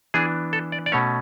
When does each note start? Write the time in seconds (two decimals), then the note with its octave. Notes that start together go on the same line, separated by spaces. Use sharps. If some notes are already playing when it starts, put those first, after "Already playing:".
0.14 E3 B3 D4 G#4
0.53 A4
0.72 D5
0.86 D5
0.92 B2 A3 C#4 C#5